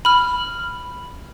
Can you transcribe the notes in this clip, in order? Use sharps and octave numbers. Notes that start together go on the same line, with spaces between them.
B5 F6